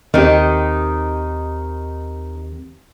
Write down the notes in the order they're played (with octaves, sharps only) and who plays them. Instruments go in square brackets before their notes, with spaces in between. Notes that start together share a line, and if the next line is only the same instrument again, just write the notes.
[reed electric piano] D#2 C4 G4 [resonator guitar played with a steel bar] D#3 D#4